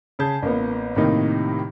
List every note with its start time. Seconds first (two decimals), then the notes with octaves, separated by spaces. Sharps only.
0.19 C#3 G#4 A5 G6
0.42 A1 A#3 B3
0.96 A2 C3 D#3 A#3 D#4